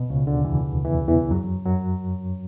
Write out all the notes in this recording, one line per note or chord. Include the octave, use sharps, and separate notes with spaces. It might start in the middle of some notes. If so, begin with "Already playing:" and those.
Already playing: B2
C#2 C#3
D2 D3
E2 E3
E2 E3
E2 E3
F#2 F#3
F#2 F#3